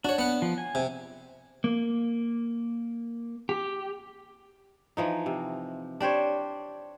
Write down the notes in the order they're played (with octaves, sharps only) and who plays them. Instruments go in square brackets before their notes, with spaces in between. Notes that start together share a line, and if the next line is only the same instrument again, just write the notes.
[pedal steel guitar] D4 [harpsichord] F#4 C#5
[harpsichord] B3 F#5
[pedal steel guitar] F3
G#5
[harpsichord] C3
[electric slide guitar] A#3
G4
[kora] E3 F3 D#4
C3
D4 G4 C5 C#5